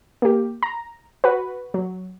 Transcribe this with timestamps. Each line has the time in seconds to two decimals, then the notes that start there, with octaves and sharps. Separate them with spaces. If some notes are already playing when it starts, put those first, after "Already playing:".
0.22 A#3 G4
0.63 A#5
1.24 F#4 B4
1.74 F#3